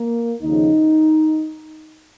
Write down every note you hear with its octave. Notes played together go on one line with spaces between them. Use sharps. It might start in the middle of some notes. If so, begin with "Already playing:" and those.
Already playing: A#3
D#2 C#3 F3 D#4